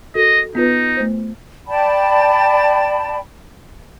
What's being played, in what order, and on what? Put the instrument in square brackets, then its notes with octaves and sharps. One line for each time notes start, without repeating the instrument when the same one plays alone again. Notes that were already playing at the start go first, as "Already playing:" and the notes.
[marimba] F#4 A4 A#4 [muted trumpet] D#5
[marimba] B3 F4 B4 [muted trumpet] D#4
[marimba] A3 C5
[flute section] D5 G5 A5 B5